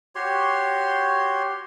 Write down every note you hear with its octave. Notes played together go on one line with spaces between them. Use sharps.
F#4 G4 C#5 C6